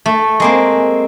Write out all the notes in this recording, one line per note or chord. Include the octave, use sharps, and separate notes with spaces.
A3
G#3 A#3 C4